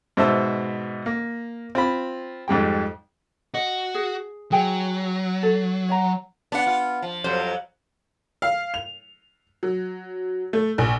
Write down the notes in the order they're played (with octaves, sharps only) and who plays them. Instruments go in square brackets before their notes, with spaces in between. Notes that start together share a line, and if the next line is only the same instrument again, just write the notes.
[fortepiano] G#2 B2 C5 E5 A5 E6
A#3
C4 F4 B5
F2 G#2 G3 G5
[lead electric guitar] F#4 [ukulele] D#5
[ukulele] G#4
[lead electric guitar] F#3 [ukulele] G#4 G5 G#5
[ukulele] A4
C#5 F#5 A#5
[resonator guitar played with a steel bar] B3 F#5 [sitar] D4
[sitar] F4
F3
[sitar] F2 F#3 G3 [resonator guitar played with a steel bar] C5
[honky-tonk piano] F5
F7
F#3
A3
A#1